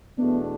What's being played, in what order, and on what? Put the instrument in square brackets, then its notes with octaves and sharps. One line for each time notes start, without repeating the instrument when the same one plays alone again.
[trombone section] E2 B2 A3 D4 [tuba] B3